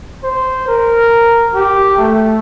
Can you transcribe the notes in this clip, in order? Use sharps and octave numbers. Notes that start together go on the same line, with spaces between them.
C5
A#4
G4
A3